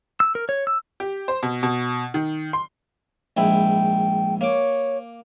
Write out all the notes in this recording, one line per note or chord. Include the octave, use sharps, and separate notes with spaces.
E6
A#4
C#5
E6
G4
C5
B2
B2
D#3
C6
A#1 G#2 E4 G5
A#3 C#5 D6